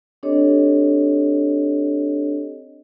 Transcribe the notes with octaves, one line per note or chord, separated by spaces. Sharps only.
C4 D4 G4 A4 C#5 D#5